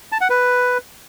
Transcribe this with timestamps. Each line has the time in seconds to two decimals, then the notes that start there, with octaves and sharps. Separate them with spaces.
0.12 A5
0.21 F#5
0.30 B4